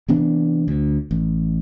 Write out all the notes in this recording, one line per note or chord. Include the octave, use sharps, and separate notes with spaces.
C3 E3 B3 D4
D2
A1